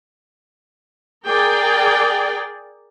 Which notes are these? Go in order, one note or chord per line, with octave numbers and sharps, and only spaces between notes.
G#4 A#4 D5 G5